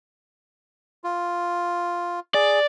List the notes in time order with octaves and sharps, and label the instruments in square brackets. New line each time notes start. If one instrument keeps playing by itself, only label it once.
[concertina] F4
[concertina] G#4 [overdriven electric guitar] D5